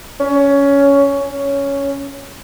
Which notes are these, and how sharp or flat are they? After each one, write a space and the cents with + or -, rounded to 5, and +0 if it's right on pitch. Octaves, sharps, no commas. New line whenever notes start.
C#4 +15
C#4 +5